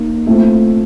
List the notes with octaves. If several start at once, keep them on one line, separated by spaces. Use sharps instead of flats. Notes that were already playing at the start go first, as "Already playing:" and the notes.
Already playing: A#3 D#4
A3 C4 F4